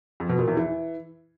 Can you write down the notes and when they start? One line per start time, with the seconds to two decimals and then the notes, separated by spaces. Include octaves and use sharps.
0.20 F2
0.29 B2
0.39 A#2
0.48 E2
0.57 E3